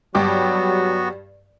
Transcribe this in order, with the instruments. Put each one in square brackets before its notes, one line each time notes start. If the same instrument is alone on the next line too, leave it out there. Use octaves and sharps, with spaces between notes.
[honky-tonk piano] G2 G4 D6 [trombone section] F#3 [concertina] B3 F#4